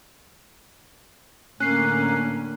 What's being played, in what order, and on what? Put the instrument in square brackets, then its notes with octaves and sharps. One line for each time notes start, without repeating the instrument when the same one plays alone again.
[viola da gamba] A2 D3 [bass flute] A#3 [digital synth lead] C#4 [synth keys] F#6 C7